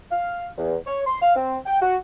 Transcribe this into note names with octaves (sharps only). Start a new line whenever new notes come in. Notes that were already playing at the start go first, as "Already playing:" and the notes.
F5
E2
C#5
C6
F5
C4
G5
F#4